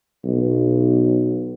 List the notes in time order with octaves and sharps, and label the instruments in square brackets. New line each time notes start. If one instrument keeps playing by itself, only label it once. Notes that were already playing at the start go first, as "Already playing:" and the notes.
[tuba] B1